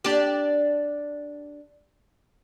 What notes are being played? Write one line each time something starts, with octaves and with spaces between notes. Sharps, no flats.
D4 G4